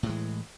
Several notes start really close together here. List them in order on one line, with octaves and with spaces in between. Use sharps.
A2 G#3 E3